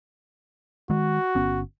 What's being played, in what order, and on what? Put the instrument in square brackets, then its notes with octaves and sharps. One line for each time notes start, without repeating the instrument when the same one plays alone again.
[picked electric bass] D#3 G#3 [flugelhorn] F#4
[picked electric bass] G1 B3 C#4